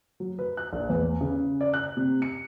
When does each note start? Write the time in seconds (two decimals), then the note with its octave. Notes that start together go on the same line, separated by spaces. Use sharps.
0.20 F#3
0.39 B4
0.57 F#6
0.73 A#1
0.89 E2
1.21 C#3
1.61 D5
1.74 F#6
1.97 C3
2.22 C#7